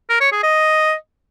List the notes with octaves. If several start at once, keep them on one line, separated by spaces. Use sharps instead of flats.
A#4
C#5
G#4
D#5